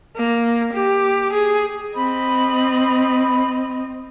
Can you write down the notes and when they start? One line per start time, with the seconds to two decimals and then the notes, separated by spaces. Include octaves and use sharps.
0.16 A#3
0.73 G4
1.32 G#4
1.94 C4 D#5 B5